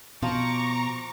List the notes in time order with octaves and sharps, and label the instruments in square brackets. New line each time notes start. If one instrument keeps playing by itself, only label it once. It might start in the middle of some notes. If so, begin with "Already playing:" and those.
[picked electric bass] B2 [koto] F3 [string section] A#5 C#6 D6